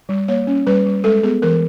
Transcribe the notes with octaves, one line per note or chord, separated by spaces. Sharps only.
G3
A#3 C#5
C#4
G3 B4
G3
G#3 A4
B3 G#4
E3 A#4